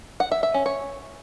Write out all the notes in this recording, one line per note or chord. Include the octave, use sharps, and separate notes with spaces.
F#5
E5
E5
C#4
C#5